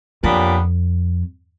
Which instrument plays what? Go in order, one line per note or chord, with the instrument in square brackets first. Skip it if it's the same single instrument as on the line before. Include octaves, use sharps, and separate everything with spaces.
[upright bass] F2 [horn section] A#2 F#3 B3 D4 G4